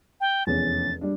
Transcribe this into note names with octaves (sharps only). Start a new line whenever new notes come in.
G5
F1 E2 C#4 A6
G3 D4